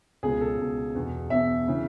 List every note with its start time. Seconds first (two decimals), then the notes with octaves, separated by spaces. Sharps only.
0.23 C#2 B2 G#4
0.41 A4
0.58 C#2 B2
0.95 E2 B2
1.30 E2 B2 E5
1.68 C#3 E3